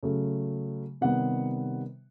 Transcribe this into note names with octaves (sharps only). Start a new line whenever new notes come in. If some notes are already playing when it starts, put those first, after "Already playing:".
C#3 F#3 A3
C3 D#3 G3 B3 F#5